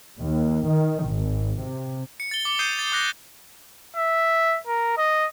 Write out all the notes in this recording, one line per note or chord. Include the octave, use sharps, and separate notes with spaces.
D#2
D#3
G#1
C3
C#7
A6 G7
D6 G7
D#6 G6 C7 D#7
A6
D6 F#6 A#6
E5
A#4
D#5